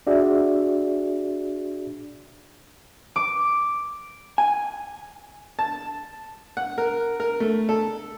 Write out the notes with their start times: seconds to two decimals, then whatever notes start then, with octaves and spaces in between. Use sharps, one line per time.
0.07 D4 F#4 G#4 D5 E5
3.16 D6
4.38 G#5
5.59 A5
6.57 F#5
6.78 A#4
7.20 A#4
7.40 A3
7.69 A4